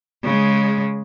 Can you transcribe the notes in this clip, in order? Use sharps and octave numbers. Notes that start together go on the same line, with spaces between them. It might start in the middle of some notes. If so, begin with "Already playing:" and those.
C#3 G#3